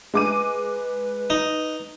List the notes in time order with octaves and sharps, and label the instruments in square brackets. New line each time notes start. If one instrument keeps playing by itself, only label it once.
[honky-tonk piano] G#3 D6 D#7 [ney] B4
[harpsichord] D#4